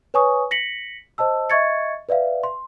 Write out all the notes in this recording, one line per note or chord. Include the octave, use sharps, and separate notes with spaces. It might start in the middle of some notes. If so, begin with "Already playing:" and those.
B4 C#5 G#5 C#6 D#6
A#6 B6 C#7 F#7
C5 D#5 A5 E6
D#5 E5 C#6 G#6 A6 C#7
B4 D5 E5 F5
C6